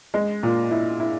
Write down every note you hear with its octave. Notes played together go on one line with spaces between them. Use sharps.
G#3
A#2
E4
E4